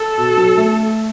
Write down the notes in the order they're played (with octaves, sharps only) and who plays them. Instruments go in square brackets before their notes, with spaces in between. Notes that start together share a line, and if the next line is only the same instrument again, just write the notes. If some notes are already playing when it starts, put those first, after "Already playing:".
Already playing: [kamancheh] A4
[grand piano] B2
F#3
A3